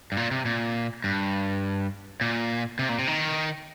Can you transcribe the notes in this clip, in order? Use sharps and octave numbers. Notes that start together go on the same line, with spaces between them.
G2
A#2
C3
A#2
G2
A#2
C3
A#2
C3
D#3